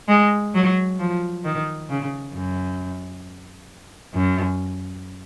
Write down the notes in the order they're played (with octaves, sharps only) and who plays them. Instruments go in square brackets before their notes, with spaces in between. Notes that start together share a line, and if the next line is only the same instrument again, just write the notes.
[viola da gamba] G#3
F#3
F3
D#3
C#3
F#2
F#2